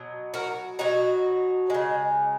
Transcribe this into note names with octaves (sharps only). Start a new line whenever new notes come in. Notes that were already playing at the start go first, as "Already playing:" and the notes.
Already playing: B2 F#3
F#4 A#4
B2 F#3 D#4 F#4
C#3 G#3